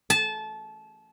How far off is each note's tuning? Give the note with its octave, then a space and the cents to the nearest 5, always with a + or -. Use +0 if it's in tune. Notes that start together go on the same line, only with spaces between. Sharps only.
A5 -25